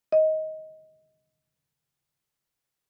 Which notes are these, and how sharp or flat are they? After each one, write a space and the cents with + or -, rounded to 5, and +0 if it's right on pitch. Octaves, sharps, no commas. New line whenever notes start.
D#5 +15